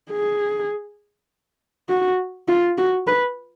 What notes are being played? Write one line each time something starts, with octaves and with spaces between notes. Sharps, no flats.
G#4
F#4
F4
F#4
B4